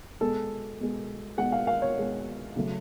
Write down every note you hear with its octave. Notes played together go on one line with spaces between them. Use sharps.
B2 G#3 A4
B2 G#3
B2 G#3 F#5
F5
F5
C#5
B2 G#3
C#3 F#3 A3